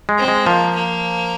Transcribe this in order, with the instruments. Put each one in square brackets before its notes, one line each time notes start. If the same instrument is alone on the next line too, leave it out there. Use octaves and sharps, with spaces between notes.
[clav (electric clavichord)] G#3
[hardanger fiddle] C4
[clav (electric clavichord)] G#3
[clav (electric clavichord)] F3 [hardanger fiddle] A#3
[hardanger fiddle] A#3